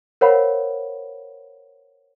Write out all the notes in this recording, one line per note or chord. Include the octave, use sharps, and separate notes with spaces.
A#4 C5 C#5 F5 F#5 B5